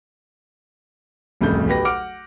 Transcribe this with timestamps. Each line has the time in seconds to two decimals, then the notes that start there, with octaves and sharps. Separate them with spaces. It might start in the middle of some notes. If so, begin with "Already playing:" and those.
1.41 D1 C2 F2 C#3 A3 G6
1.67 B1 F#3 G4 B4 A#6
1.85 F#5 D6 F6 D7